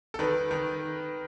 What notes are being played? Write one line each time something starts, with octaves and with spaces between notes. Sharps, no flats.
A4
D#3 B4
D#3